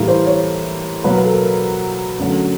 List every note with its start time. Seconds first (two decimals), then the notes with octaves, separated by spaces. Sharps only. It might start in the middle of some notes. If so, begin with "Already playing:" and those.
Already playing: A2 E3 G3 A#3 A#4
0.08 C5
0.26 C#5
1.04 B2 F#3 A#3 B4
1.25 A4
1.33 A#4
2.20 F#2 D3 F#3 A3